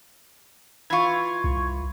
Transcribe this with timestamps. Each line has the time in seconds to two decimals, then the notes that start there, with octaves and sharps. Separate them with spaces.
0.90 E3 F4 C#6 G#6
1.44 C2